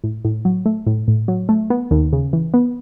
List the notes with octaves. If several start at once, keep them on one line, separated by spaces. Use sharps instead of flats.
A2
A2
F#3
A3
A2
A2
F#3
A3
B3
D#2
C#3
E3
B3